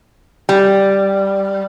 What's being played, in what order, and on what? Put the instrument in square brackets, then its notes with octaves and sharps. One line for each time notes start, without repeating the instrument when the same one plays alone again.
[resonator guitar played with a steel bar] G3